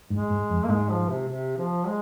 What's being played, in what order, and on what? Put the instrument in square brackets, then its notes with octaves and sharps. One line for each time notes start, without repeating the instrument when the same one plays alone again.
[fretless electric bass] G#2 [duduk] G#3
[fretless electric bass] G#2
F2
[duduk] A#3
[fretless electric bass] G#2 [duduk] G#3
[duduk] F3
C3
C3
F3
G#3